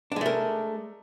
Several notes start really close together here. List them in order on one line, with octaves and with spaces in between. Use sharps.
D4 G#3 A3 A#4